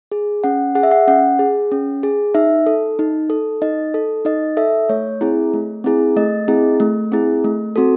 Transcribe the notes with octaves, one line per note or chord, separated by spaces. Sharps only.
G#4
C#4 F#5
G#4 F#5
E5
F#5
C#4 F#5
G#4
C#4
G#4
D#4 E5
A4
D#4
A4
D#4 D#5
A4
D#4 D#5
A4 E5
A3 C#5
C4 E4 G#4
A3
C4 E4 G#4
A3 D#5
C4 E4 G#4
A3
C4 E4 G#4
A3
C4 F#4 A4